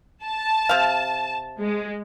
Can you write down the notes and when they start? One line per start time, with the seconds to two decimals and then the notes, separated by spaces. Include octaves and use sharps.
0.24 A5
0.69 C3 F5
1.59 G#3